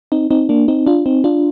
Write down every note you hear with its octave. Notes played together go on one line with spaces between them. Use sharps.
C4 D#4
C4 D#4
A#3 D4
C4 D#4
D4 F4
C4 D#4
D4 F4